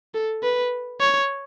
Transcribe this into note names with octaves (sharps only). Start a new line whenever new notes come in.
A4
B4
C#5